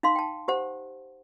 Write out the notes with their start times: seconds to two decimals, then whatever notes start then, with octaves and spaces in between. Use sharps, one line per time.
0.03 D#4 F5 C6
0.16 G5 A5
0.48 G4 C5 F#5